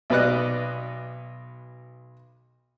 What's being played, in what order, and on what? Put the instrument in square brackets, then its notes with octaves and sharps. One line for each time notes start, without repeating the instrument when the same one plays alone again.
[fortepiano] B1 B2 B4 D5 D#5 F#6